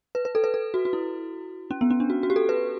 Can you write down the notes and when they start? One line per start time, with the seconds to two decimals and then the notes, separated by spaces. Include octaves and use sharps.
0.15 B4
0.25 B4
0.35 A4
0.44 B4
0.54 A4
0.74 F#4
0.85 F#4
0.93 E4
1.71 C#4
1.81 B3
1.90 C#4
2.00 D4
2.10 F#4
2.23 F#4
2.30 G4
2.36 A4
2.49 B4